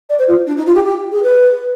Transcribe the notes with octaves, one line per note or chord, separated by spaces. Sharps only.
D5
C5
F4
D4
D#4
F4
G4
G4
G#4
B4